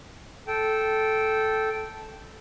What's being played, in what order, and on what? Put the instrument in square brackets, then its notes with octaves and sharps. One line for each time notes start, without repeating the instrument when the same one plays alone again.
[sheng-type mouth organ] A4 G5